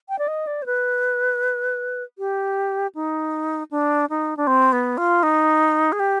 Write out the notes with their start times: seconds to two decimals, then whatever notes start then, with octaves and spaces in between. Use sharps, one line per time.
0.09 G5
0.19 D5
0.28 D#5
0.47 D5
0.62 C5
0.66 B4
2.18 G4
2.95 D#4
3.71 D4
4.10 D#4
4.37 D4
4.47 C4
4.72 B3
4.98 F4
5.23 D#4
5.92 G#4
6.00 G4